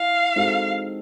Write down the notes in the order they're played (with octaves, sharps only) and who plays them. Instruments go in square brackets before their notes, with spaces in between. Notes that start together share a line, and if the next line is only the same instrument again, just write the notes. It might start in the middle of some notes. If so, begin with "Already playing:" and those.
Already playing: [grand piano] E4 [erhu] F5
[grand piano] G#3 C4 D#4 F#4 A4